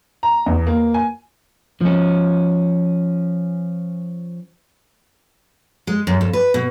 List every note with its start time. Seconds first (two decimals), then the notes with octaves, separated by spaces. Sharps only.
0.23 A#5
0.46 E2
0.67 A#3
0.94 G#5
1.81 F3 C#4
5.87 G#3
6.07 F#2
6.21 F2
6.33 B4
6.54 B2